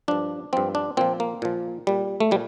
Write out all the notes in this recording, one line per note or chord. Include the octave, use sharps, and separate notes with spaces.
G2 F3 D4
G2 F3 C4
D4
A#2 F3 C4
A#3
A#2 F3
A#2 G3
A3
A#2 G3